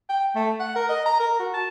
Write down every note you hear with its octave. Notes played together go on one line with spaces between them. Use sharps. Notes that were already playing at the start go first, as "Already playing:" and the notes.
G5
A3
F#5
A#4
D#5
A#5
A#4
F#4
A5